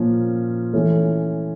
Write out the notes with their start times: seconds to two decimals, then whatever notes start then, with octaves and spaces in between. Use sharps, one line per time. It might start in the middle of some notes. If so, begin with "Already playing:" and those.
Already playing: A#2 F3 A#3 C#4
0.73 E3 A3 C#4